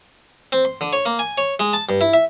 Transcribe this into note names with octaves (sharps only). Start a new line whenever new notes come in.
C4
C6
D3
C#5
A#3
G#5
C#5
G#3
A5
G2
E4
E5